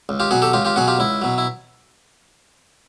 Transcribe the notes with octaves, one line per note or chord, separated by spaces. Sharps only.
C#2
F4 G4
B2 F#3 F#4 G#4
G4 A4
C#2 F4 G4
F4 G4
B2 F#3 F#4 G#4
F4 G4
C#2 E4
B2 F#3
E4